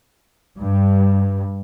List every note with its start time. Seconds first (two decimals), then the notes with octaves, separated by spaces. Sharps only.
0.58 G2